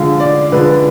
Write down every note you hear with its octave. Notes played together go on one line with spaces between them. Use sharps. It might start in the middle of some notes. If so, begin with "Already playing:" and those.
Already playing: D3 F3 G#3 F5
D5
D3 F3 G#3 B4